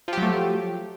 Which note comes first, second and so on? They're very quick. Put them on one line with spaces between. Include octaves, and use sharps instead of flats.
F3 G4 F#3 A3